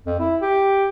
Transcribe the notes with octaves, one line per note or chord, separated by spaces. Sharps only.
F2
E4
G4